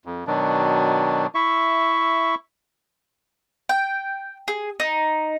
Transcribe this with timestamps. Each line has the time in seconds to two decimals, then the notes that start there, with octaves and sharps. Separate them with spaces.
0.05 F2
0.27 B2 D#3 F#3 D4
1.35 E4 E5 C#6
3.69 G5
4.48 G#4
4.80 D#4